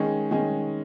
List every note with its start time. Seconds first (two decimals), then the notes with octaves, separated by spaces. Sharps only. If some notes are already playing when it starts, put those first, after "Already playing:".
Already playing: D#3 G#3 C#4
0.31 D#3 G#3 C#4